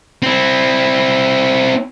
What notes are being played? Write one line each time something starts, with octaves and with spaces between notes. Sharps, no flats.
C4 E4